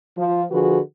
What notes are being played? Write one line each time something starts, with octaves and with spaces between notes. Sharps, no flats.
F3
D3 F3 F#4 G#4 B4